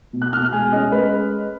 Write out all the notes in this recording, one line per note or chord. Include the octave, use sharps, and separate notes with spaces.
B2
F#6
B2 F6
G#3 G#5
C#4 D#5
G#3 B4